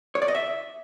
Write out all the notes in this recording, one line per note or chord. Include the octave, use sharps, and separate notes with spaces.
C#5
D5
D#5
E5